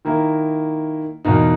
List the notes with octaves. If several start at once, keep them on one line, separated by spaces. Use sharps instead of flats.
D#3 A#3 E4
E2 B2 A#3 D#4